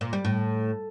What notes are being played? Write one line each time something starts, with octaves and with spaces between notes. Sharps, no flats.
A#2
G3
A2